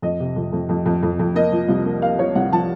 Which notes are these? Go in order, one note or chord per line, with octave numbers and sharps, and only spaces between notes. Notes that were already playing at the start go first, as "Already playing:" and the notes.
F2 D#5
C3
F2
F2
F2
F2
F2
F2
A#3 D#5
F3
C2
A#3
A#3 F5
F3 C#5
C2 F#5
F3 A5